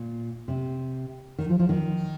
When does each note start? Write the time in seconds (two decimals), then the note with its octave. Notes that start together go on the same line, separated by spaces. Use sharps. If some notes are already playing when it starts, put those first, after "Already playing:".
Already playing: A#2
0.48 C3
1.38 D#3
1.49 F3
1.59 F3
1.69 D#3